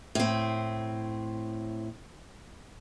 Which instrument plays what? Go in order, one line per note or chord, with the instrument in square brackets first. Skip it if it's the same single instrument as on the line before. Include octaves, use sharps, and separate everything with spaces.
[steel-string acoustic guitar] A2 C4